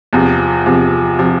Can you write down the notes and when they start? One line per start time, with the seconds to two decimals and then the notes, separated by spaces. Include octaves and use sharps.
0.13 E2 C3 F3
0.66 E2 C3 F3
1.19 C3 F3